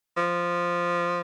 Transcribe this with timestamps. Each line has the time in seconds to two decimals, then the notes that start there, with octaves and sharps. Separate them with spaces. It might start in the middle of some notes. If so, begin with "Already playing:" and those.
0.17 F3